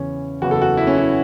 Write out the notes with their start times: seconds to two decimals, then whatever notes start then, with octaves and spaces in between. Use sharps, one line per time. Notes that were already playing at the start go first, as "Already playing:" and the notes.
Already playing: E2 C#3 E3 C#4
0.42 F#1 E2 C#3 E3 F#4
0.51 A4
0.62 F#4
0.77 E4
0.87 C#4
0.97 E4